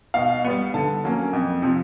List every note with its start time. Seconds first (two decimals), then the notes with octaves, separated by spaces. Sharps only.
0.14 B2 F5
0.45 G3 B3
0.74 D3 A5
1.04 F#3 A#3 C#4
1.33 F2
1.62 C3 F3